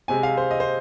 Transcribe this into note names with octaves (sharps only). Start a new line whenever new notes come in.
C3 G#3 C4 G#5
F5
C5
D#5
C5